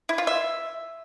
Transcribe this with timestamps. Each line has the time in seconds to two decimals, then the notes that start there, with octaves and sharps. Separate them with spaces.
0.09 E4
0.18 F4
0.27 E5